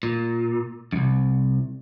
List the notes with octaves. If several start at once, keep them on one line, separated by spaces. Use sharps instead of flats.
A#2
C2 F#2